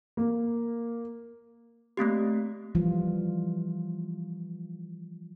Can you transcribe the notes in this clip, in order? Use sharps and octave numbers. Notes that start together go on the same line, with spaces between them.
A#3
A3 A#3 C4 G4
E3 F3 G3 F4